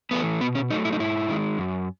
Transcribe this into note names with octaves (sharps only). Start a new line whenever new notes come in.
E3 A3 B3
B2 B3
C#4
F#3 A3 D#4
E4
D#4
G#2 E4
D#3 G#3
F#2